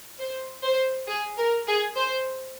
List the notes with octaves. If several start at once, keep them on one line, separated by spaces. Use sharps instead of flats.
C5
C5
G#4
A#4
G#4
C5